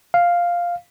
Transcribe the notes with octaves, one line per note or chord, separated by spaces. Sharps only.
F5